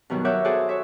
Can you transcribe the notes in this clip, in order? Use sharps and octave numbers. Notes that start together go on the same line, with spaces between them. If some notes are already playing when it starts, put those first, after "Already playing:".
G2 B2 D#3 F#3
A#4 C#5 E5 F#5 D6 G6
F#4 G#4 A4 C5 D5 F#5
C#5 E5